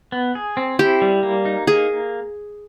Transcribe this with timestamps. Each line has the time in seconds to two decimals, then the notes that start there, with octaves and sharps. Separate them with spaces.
0.12 B3
0.35 G#4
0.57 C4
0.79 E4 G4
1.02 G3
1.23 A#3
1.45 D#4
1.67 A#3 G#4